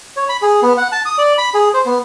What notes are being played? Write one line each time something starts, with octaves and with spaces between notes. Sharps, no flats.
C#5
B5
G#4
B3
F#5
A5
D#6
D5
B5
G#4
C5
B3